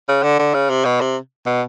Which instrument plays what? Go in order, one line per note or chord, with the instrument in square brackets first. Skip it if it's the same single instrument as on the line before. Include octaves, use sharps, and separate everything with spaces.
[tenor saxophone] C#3
D3
D3
C#3
C3
B2
C3
B2